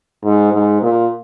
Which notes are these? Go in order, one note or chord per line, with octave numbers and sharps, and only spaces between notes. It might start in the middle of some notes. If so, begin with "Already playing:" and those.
G#2
G#2
A#2